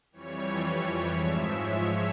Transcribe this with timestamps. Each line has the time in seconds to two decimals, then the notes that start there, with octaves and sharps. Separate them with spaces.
0.12 F2 E3 G3 C#5
0.59 C#5
1.06 G#2 F3 G#3 E5
1.53 C#5